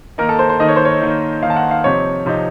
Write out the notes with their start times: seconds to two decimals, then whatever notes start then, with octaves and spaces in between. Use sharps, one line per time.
0.18 D#3 A#3 D#4 A#4
0.29 A4
0.39 C5
0.49 C5
0.60 D#3 A#3 D#4 D#5
0.69 C#5
0.76 C5
0.85 C#5
1.02 D#3 A#3 D#4
1.42 D#3 A#3 D#4 F5
1.50 A5
1.56 F#5
1.71 F5
1.84 C3 F3 C4 D#4 C#5
2.26 C3 F3 C4 D#4